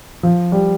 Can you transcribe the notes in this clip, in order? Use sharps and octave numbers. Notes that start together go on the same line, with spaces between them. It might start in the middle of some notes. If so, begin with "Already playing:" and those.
F3
G3